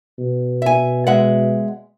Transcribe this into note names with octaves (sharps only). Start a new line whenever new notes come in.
B2
E5 G#5
G#3 E5 F#5